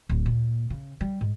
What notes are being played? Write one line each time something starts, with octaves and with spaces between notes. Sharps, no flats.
D1
A#2
C#3
G3
G#2